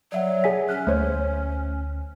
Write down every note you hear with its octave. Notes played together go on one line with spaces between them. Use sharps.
F#3 D5 E5 F#5
G#4 G#5 B6
C#4 F6 F#6
D2 A3 C5 C#5